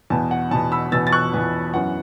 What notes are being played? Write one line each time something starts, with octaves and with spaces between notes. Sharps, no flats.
E2 B2 B3 A5
F#5
E2 B2 B3 A5
B5 E6
E2 B2 B3 E6 A6
A6
C#6 F#6
E2 B2 B3
F#2 E3 B3 F#5